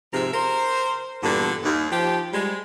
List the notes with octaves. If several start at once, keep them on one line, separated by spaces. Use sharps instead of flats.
G#2 C3 F3 A#4 E5
A#4 C5
E2 G2 A#2 D3
D#2
F3 G4
G3 G#3